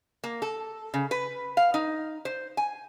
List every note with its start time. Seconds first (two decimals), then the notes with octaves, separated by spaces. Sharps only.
0.24 A#3
0.42 A4
0.94 C#3
1.11 B4
1.57 F5
1.74 D#4
2.25 C5
2.57 G#5